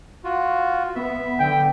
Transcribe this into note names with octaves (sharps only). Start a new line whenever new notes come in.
F4 F#4
B3 E5
D3 G5